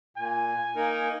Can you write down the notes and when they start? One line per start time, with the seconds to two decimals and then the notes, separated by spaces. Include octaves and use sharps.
0.17 A#2 G#5
0.76 A#3 D#4 A#4